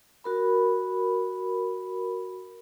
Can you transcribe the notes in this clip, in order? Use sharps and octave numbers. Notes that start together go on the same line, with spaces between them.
F#4 A#4 B5